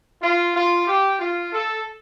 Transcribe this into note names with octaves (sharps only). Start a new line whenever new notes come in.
F4
F4
G4
F4
A4